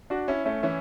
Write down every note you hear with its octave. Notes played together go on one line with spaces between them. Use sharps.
D4 F#4
C#4 E4
A3 C#4
E3 C#4 E4